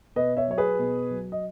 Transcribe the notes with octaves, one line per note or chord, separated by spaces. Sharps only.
B2 B4 D#5
C#5 E5
F#3 C#5
G#4 B4
B2
F#3
D#5